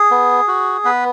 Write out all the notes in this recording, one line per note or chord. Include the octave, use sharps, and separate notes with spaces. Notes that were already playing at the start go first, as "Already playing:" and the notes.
Already playing: G#4
B3
F#4
B3 B4